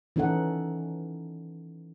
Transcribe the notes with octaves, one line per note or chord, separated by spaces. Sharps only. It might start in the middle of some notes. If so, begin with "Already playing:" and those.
E3 C#4 D#4 A4 F#5